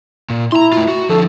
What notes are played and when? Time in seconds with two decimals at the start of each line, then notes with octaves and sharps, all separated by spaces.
0.30 A#2
0.52 E4 A#5 C6
0.73 A3 F4
0.88 F#4
1.09 D3 F3 A4